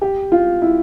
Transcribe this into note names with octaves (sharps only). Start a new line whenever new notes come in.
G4
F4
E4